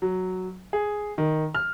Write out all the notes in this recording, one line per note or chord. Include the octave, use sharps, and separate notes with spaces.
F#3
G#4
D#3
F6